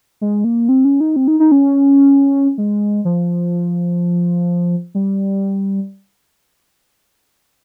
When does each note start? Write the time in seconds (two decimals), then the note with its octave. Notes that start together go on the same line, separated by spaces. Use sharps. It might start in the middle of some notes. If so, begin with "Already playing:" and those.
0.21 G#3
0.44 A#3
0.69 C4
0.85 C#4
1.00 D#4
1.16 C4
1.28 D#4
1.40 D#4
1.52 C#4
2.58 G#3
3.05 F3
4.95 G3